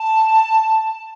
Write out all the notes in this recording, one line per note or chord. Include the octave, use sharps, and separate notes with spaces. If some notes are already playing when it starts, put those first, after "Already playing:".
Already playing: A5